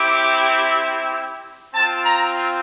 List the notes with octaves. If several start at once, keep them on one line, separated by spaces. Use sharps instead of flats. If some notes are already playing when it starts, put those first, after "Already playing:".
Already playing: C4 E4 G4 D6
C4 F4 A5
A#5